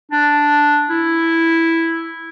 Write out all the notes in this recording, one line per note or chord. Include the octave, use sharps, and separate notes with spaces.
D4
E4